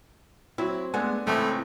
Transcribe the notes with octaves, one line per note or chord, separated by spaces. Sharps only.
F#3 C4 E4
G#3 A3 B3 D4 F#5 G#5
C#2 A2 E3 A3 C4